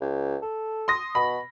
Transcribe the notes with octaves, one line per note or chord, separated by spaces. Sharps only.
C#2
A4
C6 D#6 A#6
B2 B5